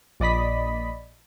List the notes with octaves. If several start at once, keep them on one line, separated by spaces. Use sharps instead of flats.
A#1 D5 D#5 B5 B6